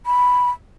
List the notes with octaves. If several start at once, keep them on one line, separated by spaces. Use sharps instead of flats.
B5